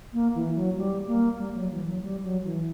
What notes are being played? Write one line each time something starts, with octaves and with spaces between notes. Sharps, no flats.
A#3
E3
F#3
G3
A#3
G3
F#3
E3
F#3
G3
F#3
E3